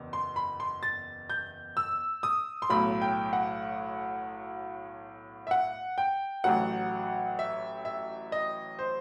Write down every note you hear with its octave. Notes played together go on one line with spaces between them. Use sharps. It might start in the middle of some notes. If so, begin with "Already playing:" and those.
Already playing: F#1 E2
C6
B5
C6
A6
G6
E6
D#6
C6
B1 A2 F#3 B5
G5
F#5
E5
F#5
G5
A1 A2 F#3 F#5
E5
E5
D#5
C5